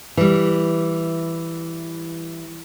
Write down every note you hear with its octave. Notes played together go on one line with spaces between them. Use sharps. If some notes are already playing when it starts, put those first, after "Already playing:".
E3 G3